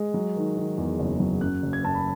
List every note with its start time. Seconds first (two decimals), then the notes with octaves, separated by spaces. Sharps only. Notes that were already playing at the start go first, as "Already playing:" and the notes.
Already playing: G#3
0.14 F#3
0.36 D#3
0.57 D#3
0.78 E2
0.99 F#1
1.20 F#3
1.41 F#2 F#6
1.63 F#1
1.73 G#6
1.84 F#2 A5
1.95 B5